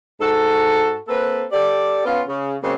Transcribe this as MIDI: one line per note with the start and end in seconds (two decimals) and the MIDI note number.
0.21 0.97 44
0.21 0.97 66
0.21 0.97 69
1.08 1.44 58
1.08 1.44 60
1.08 1.44 69
1.08 1.44 71
1.52 2.01 67
1.52 2.01 69
1.52 2.01 74
2.05 2.22 59
2.05 2.22 61
2.05 2.22 65
2.28 2.55 49
2.62 2.75 49
2.62 2.75 54
2.62 2.75 56
2.62 2.75 58
2.62 2.75 60